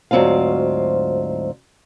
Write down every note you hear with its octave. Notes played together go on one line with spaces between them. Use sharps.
D2 G#2 F#3 C4 F4 F5